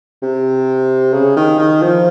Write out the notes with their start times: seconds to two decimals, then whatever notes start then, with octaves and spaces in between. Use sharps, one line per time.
0.22 C3
1.13 C#3
1.36 D#3
1.59 D#3
1.82 F3